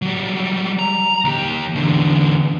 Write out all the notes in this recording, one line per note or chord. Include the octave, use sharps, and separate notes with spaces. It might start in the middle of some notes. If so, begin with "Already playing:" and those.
F#3 G3
A#5
D#2 G4
E2 D3